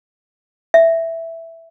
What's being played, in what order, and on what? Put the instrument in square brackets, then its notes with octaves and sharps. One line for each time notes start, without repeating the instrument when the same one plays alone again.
[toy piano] E5